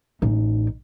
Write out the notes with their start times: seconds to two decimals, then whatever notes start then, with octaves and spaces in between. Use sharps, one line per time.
0.22 A1 D#4